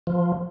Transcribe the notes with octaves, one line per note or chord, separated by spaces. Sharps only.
F3